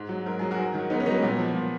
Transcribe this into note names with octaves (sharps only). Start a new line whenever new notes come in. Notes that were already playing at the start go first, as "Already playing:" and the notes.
Already playing: G#2
F#3
G#2 A#4
F#3 G#4
F#4 A#4
G#2
D#3 F#3
G#2 B3 D#4
C#4
D#3 F#3 B3 D#4
A#2 B3
F3
A#2